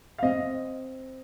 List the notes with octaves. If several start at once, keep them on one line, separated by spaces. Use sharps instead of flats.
F5
C4 D#5